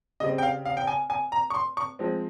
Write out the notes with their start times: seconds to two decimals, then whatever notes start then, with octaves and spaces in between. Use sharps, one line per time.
0.20 C#3 G3 C4 D#5
0.38 G5
0.43 F5
0.65 F5
0.77 G5
0.87 G#5
1.10 G#5
1.32 A#5
1.50 C#6
1.55 C6
1.77 C#6
1.99 F3 G#3 C4